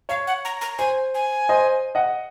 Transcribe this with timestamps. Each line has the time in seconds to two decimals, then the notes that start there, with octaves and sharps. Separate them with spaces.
0.09 C#5 F5
0.27 F#5
0.45 A#5
0.61 A#5
0.78 C5 G#5
1.14 G#5
1.49 C5 D#5
1.95 D#5 F#5